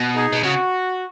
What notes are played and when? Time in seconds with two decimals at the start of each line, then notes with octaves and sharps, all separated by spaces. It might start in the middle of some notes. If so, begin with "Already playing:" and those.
Already playing: B2
0.14 D#4 G#4
0.33 B2
0.43 C#3 F#4